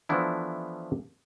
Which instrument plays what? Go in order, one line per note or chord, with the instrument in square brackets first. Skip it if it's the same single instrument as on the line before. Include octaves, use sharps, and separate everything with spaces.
[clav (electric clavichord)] E3 F3 A3 B3 D4 E4